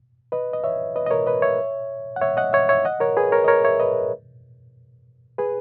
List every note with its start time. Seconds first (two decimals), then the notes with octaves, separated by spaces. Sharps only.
0.32 B4 D#5
0.53 D#5
0.64 C#5 E5
0.96 B4 D#5
1.06 D#5
1.11 A#4 C#5
1.26 B4 D#5
1.42 C#5 E5
2.16 F#5
2.22 C#5 E5
2.37 D#5 F#5
2.53 C#5 E5
2.69 C#5 E5
2.85 D#5 F#5
3.00 A#4 C#5
3.17 G#4 B4
3.32 A#4 C#5
3.44 D#5
3.48 A#4 C#5
3.64 C#5 E5
3.80 B4 D#5
5.38 G#4 B4